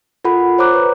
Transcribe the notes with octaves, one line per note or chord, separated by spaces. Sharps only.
F4 A4 A#4 F#5 B5
C5 C#5 A#5 D6 F#6
B4 C#5